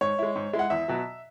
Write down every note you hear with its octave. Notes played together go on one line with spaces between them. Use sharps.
G#2 C#5
G#3 E4
G#2
G#3 E4
F#5
E2 E5
B2 F#3